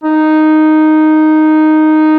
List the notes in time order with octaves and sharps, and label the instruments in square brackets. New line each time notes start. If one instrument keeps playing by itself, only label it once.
[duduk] D#4